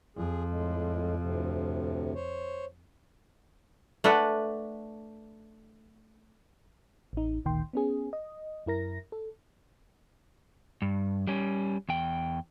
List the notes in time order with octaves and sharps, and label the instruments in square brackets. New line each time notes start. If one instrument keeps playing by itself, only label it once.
[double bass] F2 [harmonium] G#4
[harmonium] A2 G#3
D2 A2 C3
C5 C#5
[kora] A3 D4 B4 F#5
[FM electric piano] A1 D#4
G#1 D2 A#2 D#3 G5 C6
B3 C#4 G#4
D#5
F#2 E4 A#4 A#6
A4
[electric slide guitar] G2
G3 C#4
E2 G5